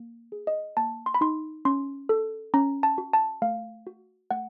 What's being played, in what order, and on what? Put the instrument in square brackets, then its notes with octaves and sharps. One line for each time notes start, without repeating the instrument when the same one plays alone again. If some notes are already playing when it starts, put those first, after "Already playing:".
Already playing: [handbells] A#3
G#4
D#5
A#3 A5
C6
B5
D#4 C6
C#4 C6
A4
C#4 A#5
A5
F#4
A5
A3 F5
F#4
A3 F#5